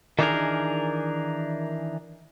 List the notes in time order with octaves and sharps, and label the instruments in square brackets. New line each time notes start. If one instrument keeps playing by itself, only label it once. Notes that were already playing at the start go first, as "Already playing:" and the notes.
[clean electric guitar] D#3 E3 D4 D#4 G#4 A#4